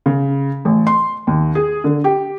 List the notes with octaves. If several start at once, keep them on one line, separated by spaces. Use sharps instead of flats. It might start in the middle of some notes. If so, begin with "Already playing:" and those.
C#3
A1
C6
D#2
G#4
D3
G4